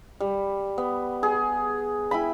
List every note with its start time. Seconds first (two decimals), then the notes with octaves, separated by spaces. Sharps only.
0.20 G3
0.78 B3
1.23 G#4
2.11 E4 G5 G#5 B5